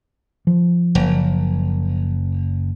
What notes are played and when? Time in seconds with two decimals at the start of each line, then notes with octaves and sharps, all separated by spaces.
0.47 F3
0.95 F#1